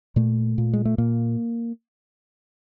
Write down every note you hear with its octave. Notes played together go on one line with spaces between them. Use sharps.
A#2 A3
A#2
G#3
A3
A#2 A#3